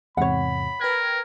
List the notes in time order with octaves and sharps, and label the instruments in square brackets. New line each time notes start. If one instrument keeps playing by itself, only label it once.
[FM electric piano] E2 G#2 C3 [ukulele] C#5 F#5 [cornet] B5
[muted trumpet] A#4 [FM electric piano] B4 G5 G#6